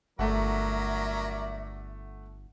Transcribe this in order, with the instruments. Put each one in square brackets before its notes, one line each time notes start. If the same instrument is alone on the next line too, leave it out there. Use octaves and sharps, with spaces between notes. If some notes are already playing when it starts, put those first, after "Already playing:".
[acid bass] G1 [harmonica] F#3 A#4 D5 [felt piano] A3 F#5 [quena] E5